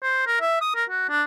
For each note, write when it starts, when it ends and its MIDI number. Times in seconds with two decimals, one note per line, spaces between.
0.03 0.27 72
0.27 0.40 70
0.41 0.61 76
0.61 0.72 87
0.75 0.84 70
0.90 1.06 66
1.09 1.23 62